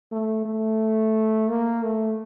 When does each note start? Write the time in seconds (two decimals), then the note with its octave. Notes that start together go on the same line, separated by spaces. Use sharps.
0.12 A3
0.45 A3
1.48 A#3
1.83 A3